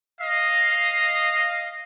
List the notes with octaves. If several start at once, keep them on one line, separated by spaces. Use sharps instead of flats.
D#5 F5